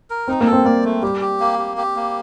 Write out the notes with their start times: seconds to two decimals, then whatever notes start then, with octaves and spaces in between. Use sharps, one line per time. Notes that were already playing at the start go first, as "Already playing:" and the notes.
0.10 A#4
0.28 C4 D#4
0.41 A#3
0.47 A4
0.53 C4
0.65 A#3 D5
0.84 A3
1.02 G3 G4
1.21 G4
1.40 A#3
1.59 G4
1.77 G4
1.96 A#3